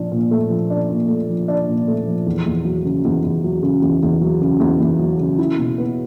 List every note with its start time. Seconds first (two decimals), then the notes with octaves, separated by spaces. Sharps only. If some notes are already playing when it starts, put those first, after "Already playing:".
Already playing: A#2 F3 D4
0.12 A#2
0.31 A3
0.50 F3
0.70 D4
0.90 A#2
1.09 A3
1.29 F3
1.48 D4
1.68 A#2
1.88 A3
2.07 F3
2.26 E2
2.46 E2
2.65 F#3
2.84 C#3
3.05 E2
3.24 E2
3.44 F#3
3.62 C#3
3.82 E2
4.03 E2
4.21 F#3
4.41 C#3
4.60 E2
4.80 E2
4.99 F#3
5.20 C#3
5.38 E4
5.58 B2
5.78 B3